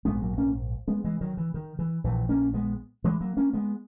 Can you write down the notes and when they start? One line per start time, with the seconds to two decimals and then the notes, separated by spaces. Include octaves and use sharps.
0.05 A#1 G#2 G#3 B3
0.21 F#3 A#3
0.38 A#3 C#4
0.88 G#3 B3
1.04 E3 G#3
1.21 D#3 F#3
1.37 E3
1.54 D#3
1.79 E3
2.04 A#1 A#2 E3
2.29 A#3 C#4
2.54 G#3 B3
3.04 E3 G#3
3.21 F#3 A#3
3.37 A#3 C#4
3.53 G#3 B3